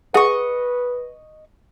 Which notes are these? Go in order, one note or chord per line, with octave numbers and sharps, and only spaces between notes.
G#4 B4 D#5 F#5 C#6